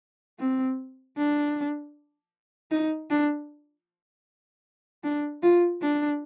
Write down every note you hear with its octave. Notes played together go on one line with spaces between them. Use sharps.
C4
D4
D#4
D4
D4
F4
D4